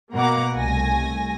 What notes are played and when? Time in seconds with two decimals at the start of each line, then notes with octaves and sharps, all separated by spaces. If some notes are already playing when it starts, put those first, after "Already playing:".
0.13 B2 A#3 F#5 A#5 D6
0.55 C2 A3 G#5 A#6